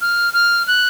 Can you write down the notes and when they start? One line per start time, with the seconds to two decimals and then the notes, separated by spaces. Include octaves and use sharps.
0.01 F6
0.33 F6
0.67 F#6